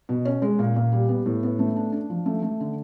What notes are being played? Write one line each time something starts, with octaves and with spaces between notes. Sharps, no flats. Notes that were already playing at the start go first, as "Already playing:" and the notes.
B2
C#4
G#3
A#2
A#2
G3
B3
A2
B3
A3
D4
D4
F3
A3
A3
D3